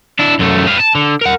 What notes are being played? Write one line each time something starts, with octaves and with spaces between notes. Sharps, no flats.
D4 E4
F#2 A3
B4 F5
A5
D3
A#4 F#5